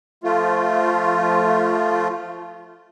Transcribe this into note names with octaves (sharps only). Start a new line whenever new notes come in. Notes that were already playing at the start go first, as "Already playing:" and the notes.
F3 A3 F4